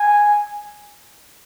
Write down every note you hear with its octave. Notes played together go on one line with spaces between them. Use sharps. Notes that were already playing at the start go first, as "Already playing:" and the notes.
Already playing: G#5